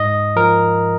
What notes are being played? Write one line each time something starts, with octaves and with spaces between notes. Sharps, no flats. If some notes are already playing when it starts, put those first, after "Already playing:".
Already playing: G#2 D#5
F3 A#4